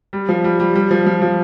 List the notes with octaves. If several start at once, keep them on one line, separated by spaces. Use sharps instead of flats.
G3
F3
G3
G3
G3
F3
F3
F3